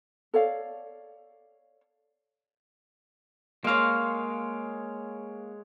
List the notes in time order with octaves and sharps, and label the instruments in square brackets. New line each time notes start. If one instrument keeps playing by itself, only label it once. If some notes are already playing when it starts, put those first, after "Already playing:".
[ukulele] A4 C#5 D5 F5
[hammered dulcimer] G#3 C#5 [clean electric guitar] A#3 F5